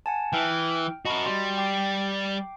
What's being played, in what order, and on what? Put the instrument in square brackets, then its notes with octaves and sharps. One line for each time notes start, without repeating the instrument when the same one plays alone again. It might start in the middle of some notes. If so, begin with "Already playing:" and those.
[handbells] F#5 G#5 A5
[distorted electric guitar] E3 [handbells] G5 F6
[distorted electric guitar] F#4 A#4 [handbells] D#5 A5 B5
[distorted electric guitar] G3 [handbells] F#4 C6
[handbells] G5 D6 C7